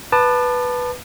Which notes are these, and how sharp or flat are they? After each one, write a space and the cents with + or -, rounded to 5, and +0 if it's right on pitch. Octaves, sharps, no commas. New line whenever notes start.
B4 +0 A5 +0 D6 +45